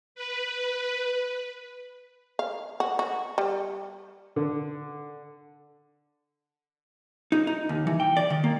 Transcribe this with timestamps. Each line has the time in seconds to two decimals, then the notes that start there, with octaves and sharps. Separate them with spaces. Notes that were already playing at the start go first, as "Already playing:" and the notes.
0.15 B4
2.39 F5
2.80 F#4
2.99 F#4
3.38 G3
4.36 D3
7.32 D#4
7.47 D#4
7.69 D#2
7.87 E3
8.00 G5
8.17 D5
8.30 D#3
8.44 A#3